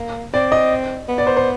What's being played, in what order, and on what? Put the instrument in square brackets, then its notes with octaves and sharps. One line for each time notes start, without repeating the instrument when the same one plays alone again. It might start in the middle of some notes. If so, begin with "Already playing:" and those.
Already playing: [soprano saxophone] A#3
[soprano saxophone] C4 [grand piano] D5
[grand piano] D#5
[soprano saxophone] B3
[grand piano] D5
C5
C5